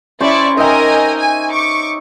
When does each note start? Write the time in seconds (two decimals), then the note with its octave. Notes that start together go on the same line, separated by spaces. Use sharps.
0.21 C#4 E4 G4 C5 D5 C#6
0.57 D#4 A#4 D#5 E5 G5 G#5
1.17 G#5
1.51 C#6 D6